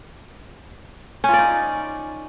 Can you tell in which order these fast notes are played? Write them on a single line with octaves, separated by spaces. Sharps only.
C#4 F4 D5 D#4